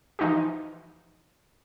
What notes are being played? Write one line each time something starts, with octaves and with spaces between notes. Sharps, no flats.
E3 F3 D#4 F#4 G4